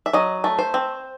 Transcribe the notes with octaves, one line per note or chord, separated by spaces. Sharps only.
E5
F#3 D#5
A3
C5
C4